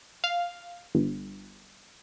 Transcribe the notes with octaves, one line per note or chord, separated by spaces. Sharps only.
F5
G1